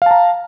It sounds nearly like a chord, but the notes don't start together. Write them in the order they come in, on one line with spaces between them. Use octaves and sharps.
F5 A5 A#5